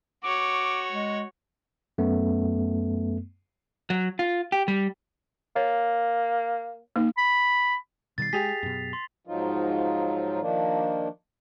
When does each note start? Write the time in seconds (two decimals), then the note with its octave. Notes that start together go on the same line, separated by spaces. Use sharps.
0.24 F#4 C#5 D6
0.91 G#3
1.98 F#2 A3 B3
3.90 F#3
4.19 F4
4.52 G4
4.68 G3
5.56 A#3 C#5
6.96 A#3 D#4
7.17 B5
8.18 B2 D#3 G3 A6 C7
8.33 G#3 G4 G#4 B6 F7
8.63 F#2 B2
8.93 C6
9.27 G#2 F3 F#3 D#4 F4
10.41 D#3 F3 A#3 D4